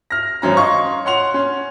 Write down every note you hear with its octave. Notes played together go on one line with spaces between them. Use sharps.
F6 A#6
G#1 F#2 C#4 A#5
D#5 F5 C6 C#6
C#5 F#5 C6 F7
C#4